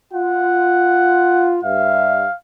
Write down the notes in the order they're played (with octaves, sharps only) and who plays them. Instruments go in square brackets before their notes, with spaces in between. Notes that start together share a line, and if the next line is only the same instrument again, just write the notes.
[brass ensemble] F4 [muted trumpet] F#5
[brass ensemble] G2 E5 [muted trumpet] F5